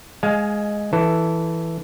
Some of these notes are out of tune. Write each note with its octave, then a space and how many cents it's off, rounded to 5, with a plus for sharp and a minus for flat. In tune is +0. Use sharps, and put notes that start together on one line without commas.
G#3 +0 F5 +10 G#5 +30
E3 +0 A4 +0